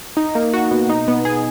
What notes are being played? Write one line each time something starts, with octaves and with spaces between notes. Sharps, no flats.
D#4
A#3
F#4
B2
D#4
B3
G#4